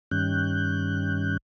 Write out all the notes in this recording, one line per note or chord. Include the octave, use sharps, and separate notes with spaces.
G2 D#3 G3 C#4 F#6 G6